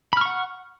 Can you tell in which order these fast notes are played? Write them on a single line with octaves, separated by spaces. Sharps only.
B5 F6 C#6 F#5